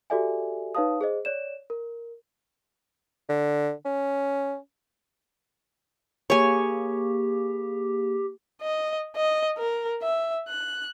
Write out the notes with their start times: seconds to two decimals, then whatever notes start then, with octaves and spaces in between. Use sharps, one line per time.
0.10 F#4 G4 A4 D5 E5 G#5
0.75 D#4 B4 C#5 F5 A5 D#6
1.01 G#4 C5 D#5
1.25 C#5 D5 E7
1.70 A#4
3.29 D3
3.85 C#4
6.30 A#3 G4 G#4 C#5 G#5 B5
8.62 D#5
9.16 D#5
9.58 A#4
10.03 E5
10.49 F#6